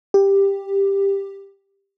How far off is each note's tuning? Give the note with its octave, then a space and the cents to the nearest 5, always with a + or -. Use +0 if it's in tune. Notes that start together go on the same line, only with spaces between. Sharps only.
G4 +10